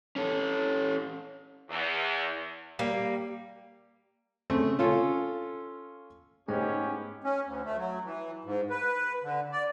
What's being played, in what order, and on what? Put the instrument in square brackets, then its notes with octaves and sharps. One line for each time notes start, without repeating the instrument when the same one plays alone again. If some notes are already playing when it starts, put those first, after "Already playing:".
[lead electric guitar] C#4 A4
[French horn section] E2
[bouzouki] G3 A#3
[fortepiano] C#3 A3 C4
C#4 F4 A4
[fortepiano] G#2 [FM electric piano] A3 G#4 [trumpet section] B3 C#4 G4 [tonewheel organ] D#4
[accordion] C#4
D2
A3
F#3
E3
G#2
B4
D3
D5